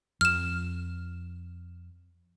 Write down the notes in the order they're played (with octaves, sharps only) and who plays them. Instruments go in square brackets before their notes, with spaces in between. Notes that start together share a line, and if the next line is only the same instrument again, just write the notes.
[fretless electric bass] F2 [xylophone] F6 E7